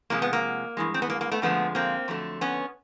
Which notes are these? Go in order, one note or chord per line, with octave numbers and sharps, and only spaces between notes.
C3 F3 G#3 A#3
B3
A#3
G2 E3 G#3
C4
B3
A#3
A#3
A3 B3
F2 D3 F3 G#3 A3 B3
A#3 C4
F2 D3 F#3 A3
B3 C#4